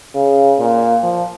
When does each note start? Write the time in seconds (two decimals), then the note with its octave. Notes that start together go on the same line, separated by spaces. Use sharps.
0.14 C#3
0.59 A#2
1.04 F3